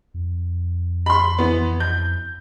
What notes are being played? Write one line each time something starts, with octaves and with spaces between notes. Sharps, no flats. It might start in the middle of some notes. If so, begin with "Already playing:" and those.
F2
B5 C6
E3 B3
G6